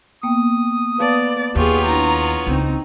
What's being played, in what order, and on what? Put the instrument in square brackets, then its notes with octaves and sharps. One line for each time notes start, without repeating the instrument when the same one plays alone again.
[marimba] A#3 B3 G5 [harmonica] D#6
[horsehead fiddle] B3 D5 [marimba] B4 F5 A5
[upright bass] D#2 [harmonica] B3 F4 C#5 [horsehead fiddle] G4 G#4
[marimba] D4 E4 [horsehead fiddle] A#5
[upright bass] C#2 [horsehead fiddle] C4 D#4